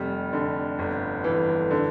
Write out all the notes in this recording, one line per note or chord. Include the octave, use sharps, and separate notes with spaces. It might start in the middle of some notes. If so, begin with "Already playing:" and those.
Already playing: F1 G3
D3
G1
E3
D3